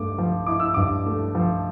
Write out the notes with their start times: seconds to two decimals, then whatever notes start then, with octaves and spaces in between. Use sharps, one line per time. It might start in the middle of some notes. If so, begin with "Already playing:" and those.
Already playing: G2 A3 D6
0.18 F3
0.46 E4 D6
0.60 E6
0.74 G2 D6
1.06 A3
1.35 F3